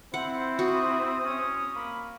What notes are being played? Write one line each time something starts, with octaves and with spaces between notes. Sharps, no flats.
C4 E4 C5 F#5
F#4 D#6
C#4
A#3 B5